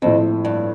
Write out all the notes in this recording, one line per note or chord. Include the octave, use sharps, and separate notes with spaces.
F2 A2 F3 A3 C4
G2